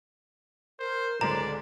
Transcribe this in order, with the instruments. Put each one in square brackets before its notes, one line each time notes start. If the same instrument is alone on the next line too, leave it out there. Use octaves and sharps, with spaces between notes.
[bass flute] A#4 [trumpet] C5
[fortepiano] C#2 G#2 G#3 [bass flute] D3 [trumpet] D5 [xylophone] A#5